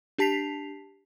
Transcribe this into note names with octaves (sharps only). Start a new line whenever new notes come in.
D4 G4 A5 B6 C7 F7